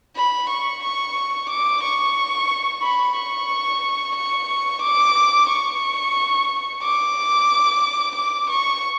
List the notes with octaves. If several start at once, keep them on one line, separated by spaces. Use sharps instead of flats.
B5
C#6
C#6
D6
C#6
B5
C#6
C#6
D6
C#6
D6
D6
C#6